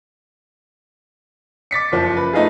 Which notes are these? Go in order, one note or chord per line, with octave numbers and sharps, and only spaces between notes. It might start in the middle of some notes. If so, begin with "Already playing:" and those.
D6 A6 B6 C#7
F#1 F3 C5
B4
A3 D#4 F4 G#4